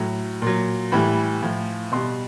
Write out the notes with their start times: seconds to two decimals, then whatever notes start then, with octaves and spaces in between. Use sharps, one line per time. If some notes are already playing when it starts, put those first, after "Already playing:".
Already playing: A2 F#3
0.42 A#2 F#3
0.92 A2 E3 G3 B5
1.42 A2 F3
1.92 B2 G3 C6